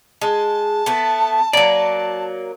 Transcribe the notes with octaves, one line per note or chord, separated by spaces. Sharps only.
G#3 A5
A3 B3
F#3 A#3 D5